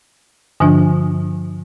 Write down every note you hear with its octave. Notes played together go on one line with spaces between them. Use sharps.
G2 D3 F3 D4